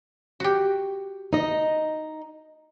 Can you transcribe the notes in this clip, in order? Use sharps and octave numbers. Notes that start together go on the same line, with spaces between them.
F#4 G4
D#4 D#5